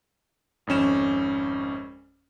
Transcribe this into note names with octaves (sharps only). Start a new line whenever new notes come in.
G#1 F2 C#4 E7